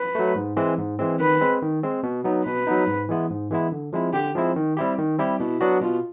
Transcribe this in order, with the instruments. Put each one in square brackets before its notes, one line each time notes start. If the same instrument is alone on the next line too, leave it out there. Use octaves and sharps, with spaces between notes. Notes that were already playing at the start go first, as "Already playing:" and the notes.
Already playing: [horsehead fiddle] B4
[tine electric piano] F#3 A3
G#2
E3 G#3 C4
G#2
E3 G#3 C4
[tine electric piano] D#3 [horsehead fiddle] B4
[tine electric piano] G#3 C4
D#3
G#3 C4
B2
F#3 B3 D#4
[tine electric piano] B2 [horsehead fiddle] B4
[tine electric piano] F#3 B3 D#4
G#2
E3 G#3 B3 E4
G#2
E3 G#3 B3 E4
D3
F3 G#3 C4 E4
[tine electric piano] D3 [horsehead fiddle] G4
[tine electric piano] F3 G#3 C4 E4
D#3
G3 C4 E4 G4
D#3
G3 C4 E4 G4
[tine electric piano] B2 [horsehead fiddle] E4
[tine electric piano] F#3 B3 D4 F#4
[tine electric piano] B2 [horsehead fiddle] F4